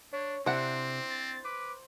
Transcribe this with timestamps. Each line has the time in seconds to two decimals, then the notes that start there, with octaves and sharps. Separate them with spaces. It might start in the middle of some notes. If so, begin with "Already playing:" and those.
0.13 D4 C#5
0.46 C3 C4 D4 E4 C5 F#5
1.10 A6
1.45 B4 D6